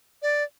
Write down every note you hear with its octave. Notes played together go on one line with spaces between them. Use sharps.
D5